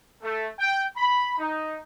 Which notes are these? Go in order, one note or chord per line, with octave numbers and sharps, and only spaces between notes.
A3
G5
B5
D#4